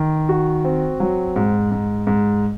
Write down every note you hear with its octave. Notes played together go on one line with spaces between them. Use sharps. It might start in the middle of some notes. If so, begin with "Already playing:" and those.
Already playing: D#3
F#4
C4
F#3
G#2
G#2
G#2